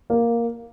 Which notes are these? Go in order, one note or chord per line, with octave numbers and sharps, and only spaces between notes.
A#3